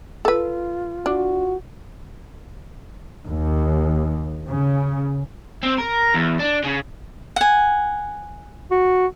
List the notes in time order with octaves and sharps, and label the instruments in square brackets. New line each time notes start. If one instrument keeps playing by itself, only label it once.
[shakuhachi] F4 [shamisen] A4 B4
[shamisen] D4 [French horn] F#4
[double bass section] D#2
C#3
[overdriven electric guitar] C4
A#4
E2
D4
C#3
[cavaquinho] F#5 G#5
[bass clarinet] F#4